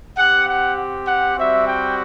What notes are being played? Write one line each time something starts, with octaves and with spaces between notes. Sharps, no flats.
C4 G4 F#5
F#5
F#5
G3 C4 F#4 E5
G5